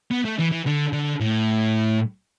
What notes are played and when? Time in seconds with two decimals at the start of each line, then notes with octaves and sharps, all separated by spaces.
0.11 B3
0.25 A3
0.39 E3
0.52 E3
0.66 D3
0.93 D3
1.21 A2